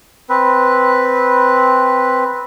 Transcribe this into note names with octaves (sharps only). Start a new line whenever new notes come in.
C4 B4